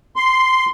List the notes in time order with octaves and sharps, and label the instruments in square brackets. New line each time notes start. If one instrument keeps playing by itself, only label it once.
[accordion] C6